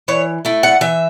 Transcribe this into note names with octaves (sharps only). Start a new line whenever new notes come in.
E3 C#5
A3 E4
F#5
E3 E5